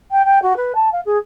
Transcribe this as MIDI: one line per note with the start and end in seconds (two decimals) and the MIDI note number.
0.11 0.25 79
0.25 0.39 79
0.42 0.56 66
0.56 0.72 71
0.75 0.89 81
0.92 1.00 77
1.05 1.18 68